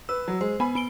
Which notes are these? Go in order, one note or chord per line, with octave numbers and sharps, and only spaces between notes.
B4 E6
F#3
G#3 C5
B3 G#5 B5
B3 D7 G7